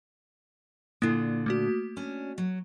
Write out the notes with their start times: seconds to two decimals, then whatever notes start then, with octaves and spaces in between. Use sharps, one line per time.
1.02 A#2 D3 A#3 E4
1.46 A3 A#3 F#4
1.97 C#4 D4
2.38 F#3